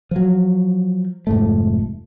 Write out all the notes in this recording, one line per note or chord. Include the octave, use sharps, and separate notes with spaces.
F3 F#3
F1 G#2 A3